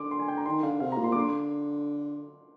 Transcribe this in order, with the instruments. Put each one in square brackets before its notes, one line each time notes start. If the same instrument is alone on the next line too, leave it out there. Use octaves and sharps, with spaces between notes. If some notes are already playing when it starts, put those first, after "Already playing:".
Already playing: [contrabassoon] D3 [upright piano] C6 D6
[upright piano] C6
G#5
G5
A#5
[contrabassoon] D#3 [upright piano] C6
[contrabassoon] D3 [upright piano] F5
[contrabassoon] C3 [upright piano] F5
[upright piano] A#5
[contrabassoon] A#2
[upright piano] C6
D6
[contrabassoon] D3 [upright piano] C6